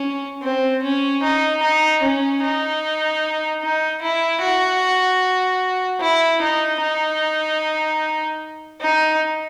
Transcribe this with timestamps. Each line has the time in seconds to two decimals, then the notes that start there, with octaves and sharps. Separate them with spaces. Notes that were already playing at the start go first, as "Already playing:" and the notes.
Already playing: C#4
0.42 C4
0.83 C#4
1.23 D#4
1.62 D#4
2.02 C#4
2.42 D#4
3.62 D#4
4.02 E4
4.42 F#4
6.01 E4
6.42 D#4
6.81 D#4
8.81 D#4